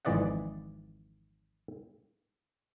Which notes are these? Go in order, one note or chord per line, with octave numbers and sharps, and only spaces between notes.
G#1 F2 E3 D5 D#5 F#5